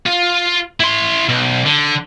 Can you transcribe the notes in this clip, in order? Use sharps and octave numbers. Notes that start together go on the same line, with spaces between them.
F4
E4 C6
B1
D3